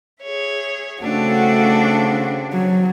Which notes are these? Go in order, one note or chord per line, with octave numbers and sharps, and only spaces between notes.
G#4 C#5 E5
C#3 A3 C4 D4 F#4 A4 F#5
F#3 D4